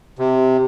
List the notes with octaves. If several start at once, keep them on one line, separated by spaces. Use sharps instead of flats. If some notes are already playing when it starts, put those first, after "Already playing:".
C3